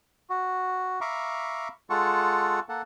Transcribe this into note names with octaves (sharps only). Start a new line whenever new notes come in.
F#4
E5 F5 A#5 B5 C#6 D6
G#3 F4 A4 F#5 C#6
A#3 A4 F#5